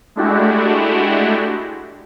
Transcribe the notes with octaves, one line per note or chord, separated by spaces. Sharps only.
G#3 A3 D4 E4 F#4 G4